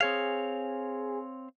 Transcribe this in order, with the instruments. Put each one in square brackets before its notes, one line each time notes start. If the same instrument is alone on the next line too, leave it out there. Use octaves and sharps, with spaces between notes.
[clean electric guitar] C4 C#5 F5 [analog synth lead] G#4